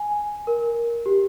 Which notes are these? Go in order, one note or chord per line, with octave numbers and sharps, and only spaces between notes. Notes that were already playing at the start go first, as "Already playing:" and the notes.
Already playing: G#5
A#4
G4